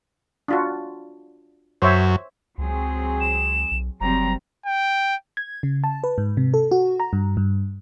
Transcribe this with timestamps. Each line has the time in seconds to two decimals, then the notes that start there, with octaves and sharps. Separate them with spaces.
0.48 D4 F4 F#4
1.82 F#2 C5 C#5 E5
2.58 C#2 F#3 C4 G#4
3.21 E7
3.71 B1
4.01 F#1 F#3 G3 C4 A#5
4.66 G5
5.37 G#6
5.63 C#3
5.84 A5
6.04 B4
6.18 G#2
6.37 C3
6.54 A4
6.71 F#4
7.00 A#5
7.13 G2
7.37 G2